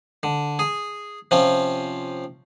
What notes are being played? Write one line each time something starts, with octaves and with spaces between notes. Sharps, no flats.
D3
G#4
C3 F3 C#4 F4